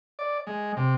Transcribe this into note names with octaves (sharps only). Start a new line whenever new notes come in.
D5
G#3
C3